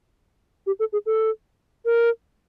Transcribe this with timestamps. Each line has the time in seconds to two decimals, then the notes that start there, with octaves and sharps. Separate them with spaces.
0.66 G4
0.79 A4
0.93 G#4
1.06 A4
1.85 A#4